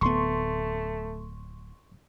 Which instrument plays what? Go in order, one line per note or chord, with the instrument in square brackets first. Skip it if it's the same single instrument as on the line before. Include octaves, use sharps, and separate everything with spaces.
[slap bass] D1 B3 [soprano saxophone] A3 [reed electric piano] C6 C#6